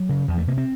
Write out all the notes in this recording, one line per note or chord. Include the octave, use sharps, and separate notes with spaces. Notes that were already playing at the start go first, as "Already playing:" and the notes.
Already playing: F#3
C#3
E2 F3
A3
C3 A#3
C4